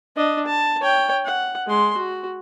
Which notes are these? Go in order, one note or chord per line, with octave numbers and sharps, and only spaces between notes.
D4 D#5
A5
C#5 G5
F#5
G#3 C6
F#4